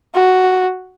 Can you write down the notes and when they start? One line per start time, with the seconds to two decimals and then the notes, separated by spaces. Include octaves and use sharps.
0.14 F#4